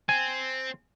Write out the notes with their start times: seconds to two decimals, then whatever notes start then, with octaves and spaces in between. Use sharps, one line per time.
0.09 C4 G#5